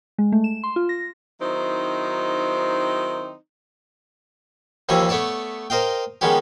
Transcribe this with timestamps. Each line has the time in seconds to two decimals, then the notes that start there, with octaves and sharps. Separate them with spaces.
0.18 G#3
0.32 A3
0.44 E7
0.63 C6
0.76 F4
0.89 A#6
1.40 D#3 F#3 C4 D#4 E4 C5
4.89 D#2 E3 F3 G3 C#5 G#5
5.09 A3 B3 C#5 D5 A5
5.70 A#4 C5 D#5 F5 G5
6.21 D#3 G3 G#3 B3 C#4 G4